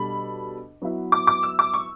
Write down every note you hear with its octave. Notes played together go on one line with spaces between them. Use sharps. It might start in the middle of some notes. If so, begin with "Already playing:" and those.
Already playing: B2 G3 D4 A4 B5
F#3 B3 E4 B4 E5
D6
D6
E6
D6
C#6